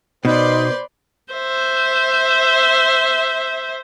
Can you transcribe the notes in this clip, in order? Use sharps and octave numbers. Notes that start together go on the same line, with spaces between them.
B2 D#4 B4 C5 D5 C6
C5 E5